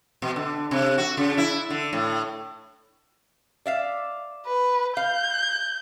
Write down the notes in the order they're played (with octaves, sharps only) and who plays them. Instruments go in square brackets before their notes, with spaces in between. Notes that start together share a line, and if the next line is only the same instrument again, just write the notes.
[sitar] B2
D3
C3
F#4
C#3
E4
D3
A2
[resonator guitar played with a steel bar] D5 E5 F5
[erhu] B4
[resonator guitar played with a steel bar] F5 [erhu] G6